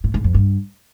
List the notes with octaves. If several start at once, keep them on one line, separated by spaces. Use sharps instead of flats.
A2
G#2
F2
G2